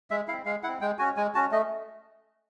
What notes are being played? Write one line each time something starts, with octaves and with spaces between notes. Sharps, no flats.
G#3 E5
C4 E4 F5
G#3 F5
C4 E4 F#5
G#3 G5
C#4 F#4 G#5
G#3 G#5
C#4 F#4 A5
A3 D#5